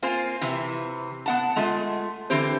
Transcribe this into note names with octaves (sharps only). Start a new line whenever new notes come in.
A#3 C4 F4 C5 G#5
C3 E3
B3 F#5 A5
G#3 A3 F4
D3 E3 C4 G4 C5